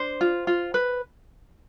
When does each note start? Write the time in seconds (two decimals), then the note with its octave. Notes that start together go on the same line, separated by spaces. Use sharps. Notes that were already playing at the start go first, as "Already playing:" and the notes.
Already playing: D4 C5
0.21 F4
0.47 F4
0.74 B4